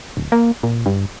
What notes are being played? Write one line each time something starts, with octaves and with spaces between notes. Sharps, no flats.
D1
A#3
A#2
G2